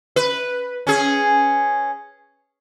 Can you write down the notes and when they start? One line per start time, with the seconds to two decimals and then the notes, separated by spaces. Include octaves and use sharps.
0.16 B4
0.87 C#4 G#4